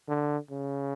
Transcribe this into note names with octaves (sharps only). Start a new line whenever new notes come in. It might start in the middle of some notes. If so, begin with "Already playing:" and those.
D3
C#3